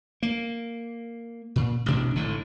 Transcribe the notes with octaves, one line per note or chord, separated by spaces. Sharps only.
A#3
A#2
A1 D2 B2 D4
G#1 A2 D3